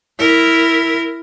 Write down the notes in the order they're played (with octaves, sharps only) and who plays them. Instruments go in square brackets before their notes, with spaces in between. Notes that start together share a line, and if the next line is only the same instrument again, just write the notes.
[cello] E4 A#4